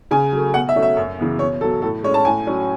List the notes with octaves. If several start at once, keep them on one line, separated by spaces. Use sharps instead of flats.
C#3 G#5
F#3 A3
B2 F#5
E5
F#3 A3 C#4
E5
F#2
C#3 E3 B3
B2 C#5
F#3 B3 A4
A2 A4
G#3 C#4 C#5
A5
A2 G#5
F#3 C#4